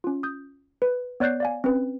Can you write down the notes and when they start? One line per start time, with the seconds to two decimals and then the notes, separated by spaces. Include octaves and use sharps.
0.04 C#4 F4
0.23 D#6 G6
0.82 B4
1.20 B3 C#5 D5 F#6 G6 C7
1.40 D5 F5 G#5
1.64 C4 C#4 B4